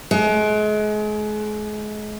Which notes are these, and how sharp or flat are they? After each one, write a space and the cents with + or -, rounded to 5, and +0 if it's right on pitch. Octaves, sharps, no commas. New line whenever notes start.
G#3 +35